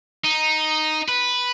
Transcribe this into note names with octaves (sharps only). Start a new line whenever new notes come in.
D#4
B4